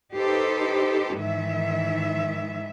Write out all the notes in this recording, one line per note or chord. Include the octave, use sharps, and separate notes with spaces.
D#4 G4 A4 B4 C5
G#2 D#3 E3 E5